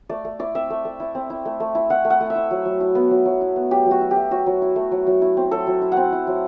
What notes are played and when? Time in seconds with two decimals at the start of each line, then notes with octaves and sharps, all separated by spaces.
0.09 A3 D5
0.25 A3
0.39 E4 D5
0.55 C4 E5
0.70 A3
0.85 A3
1.00 E4
1.15 C4
1.30 E4
1.45 A3
1.60 A3
1.75 E4
1.90 E4 F#5
2.05 A3
2.10 F#5
2.20 A3
2.30 E5
2.35 E4
2.51 F#3
2.65 F#3
2.80 E4
2.95 B3
3.11 F#3
3.26 F#3
3.41 E4
3.56 B3
3.71 F#3 G4
3.86 F#3
3.91 F#4
4.01 E4
4.11 G4
4.16 A3
4.31 F#3 F#4
4.46 F#3
4.62 E4
4.76 A3
4.91 F#3
5.07 F#3
5.22 E4
5.37 C4
5.51 F#3 A4
5.67 F#3
5.82 E4
5.92 C4 F#5
6.12 E4
6.27 F#3